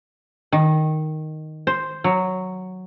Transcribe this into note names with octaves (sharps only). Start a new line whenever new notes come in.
D#3
C5
F#3